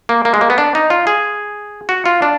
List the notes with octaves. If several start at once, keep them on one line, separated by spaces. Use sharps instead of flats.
A#3
A#3
G#3
A#3
B3
D4
D#4
F4
G#4
F#4
F4
D4